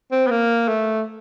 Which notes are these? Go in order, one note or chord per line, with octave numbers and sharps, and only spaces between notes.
C4
B3
A#3
A3